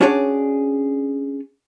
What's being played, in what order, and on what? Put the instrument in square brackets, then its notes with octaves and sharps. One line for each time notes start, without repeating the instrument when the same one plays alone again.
[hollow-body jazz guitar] C#4 D4 F#4 G#4 C#5 D5